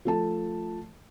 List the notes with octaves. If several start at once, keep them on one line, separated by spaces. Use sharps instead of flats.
F3 A3 A5